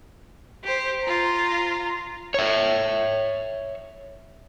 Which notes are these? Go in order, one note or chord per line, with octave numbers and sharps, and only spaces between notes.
G4 C5
F4 A#5
C#5 E5